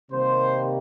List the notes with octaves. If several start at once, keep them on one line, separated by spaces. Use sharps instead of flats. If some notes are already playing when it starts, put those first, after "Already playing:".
C3 D#3 G3 A#3 C5